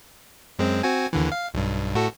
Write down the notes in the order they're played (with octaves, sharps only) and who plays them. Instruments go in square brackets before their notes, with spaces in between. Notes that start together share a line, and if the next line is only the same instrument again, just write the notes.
[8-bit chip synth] F#2 G#3 C4
C4 F#4 G#5
D#2 D3 E3
F5
B1 G2
A2 F#4 A4